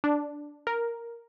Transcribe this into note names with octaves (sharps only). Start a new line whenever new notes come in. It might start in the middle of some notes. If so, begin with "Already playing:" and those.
D4
A#4